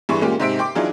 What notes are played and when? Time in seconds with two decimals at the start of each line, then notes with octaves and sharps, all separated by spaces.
0.09 G2 E3 G#4 C6 C#6
0.21 A#2 G#3 A#3 C#4 F4 G4
0.40 G#2 C3 C5 E5 B6 D7
0.59 G5 C6 D6
0.75 E3 F#3 D4 D#4 F4 G#4